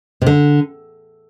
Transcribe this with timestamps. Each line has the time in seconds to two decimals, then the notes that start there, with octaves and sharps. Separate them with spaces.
0.22 C3
0.26 D3